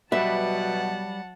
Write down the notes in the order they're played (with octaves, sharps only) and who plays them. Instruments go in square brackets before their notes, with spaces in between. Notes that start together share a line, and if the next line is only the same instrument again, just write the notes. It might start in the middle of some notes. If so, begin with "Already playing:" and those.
[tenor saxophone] B2 [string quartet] F#3 F#5 A5 [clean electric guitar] G3 B4 [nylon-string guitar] E5